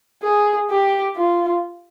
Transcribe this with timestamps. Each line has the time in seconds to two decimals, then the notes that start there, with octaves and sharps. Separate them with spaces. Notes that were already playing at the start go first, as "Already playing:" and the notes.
0.23 G#4
0.70 G4
1.16 F4